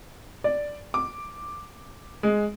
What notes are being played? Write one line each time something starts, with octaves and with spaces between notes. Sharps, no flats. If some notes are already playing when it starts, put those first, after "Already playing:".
D5
D6
G#3